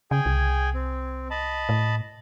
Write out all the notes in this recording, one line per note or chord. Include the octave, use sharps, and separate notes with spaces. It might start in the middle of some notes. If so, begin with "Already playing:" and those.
C#3 G#4 G5 G#5
C2
C4
D#5 A5 B5
A2